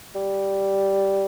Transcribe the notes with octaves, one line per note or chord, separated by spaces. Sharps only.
G3